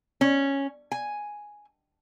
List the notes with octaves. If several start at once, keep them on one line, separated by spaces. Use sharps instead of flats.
C#4
G#5